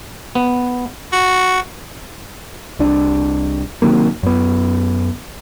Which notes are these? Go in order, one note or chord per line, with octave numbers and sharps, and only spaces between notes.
B3
F#4
C2 D4
C3 D#3 F#3 A#3
F#2 B3